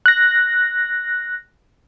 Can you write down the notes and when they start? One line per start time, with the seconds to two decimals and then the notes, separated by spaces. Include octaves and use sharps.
0.06 F#6 A#6